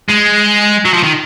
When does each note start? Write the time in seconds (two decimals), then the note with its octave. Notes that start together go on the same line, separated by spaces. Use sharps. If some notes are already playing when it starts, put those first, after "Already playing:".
0.10 G#3
0.85 F#3
0.94 F3
1.04 D#3